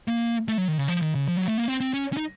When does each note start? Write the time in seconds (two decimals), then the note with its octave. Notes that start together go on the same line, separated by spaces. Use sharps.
0.08 A#3
0.48 A3
0.58 F#3
0.68 D#3
0.78 C#3
0.88 F3
1.02 D#3
1.15 C#3
1.28 F3
1.37 F#3
1.48 A3
1.58 A#3
1.68 C4
1.80 C4
1.94 C#4
2.13 C#4
2.17 D#4